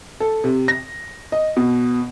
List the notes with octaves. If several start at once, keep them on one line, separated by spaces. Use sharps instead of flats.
A4
C3
A#6
D#5
B2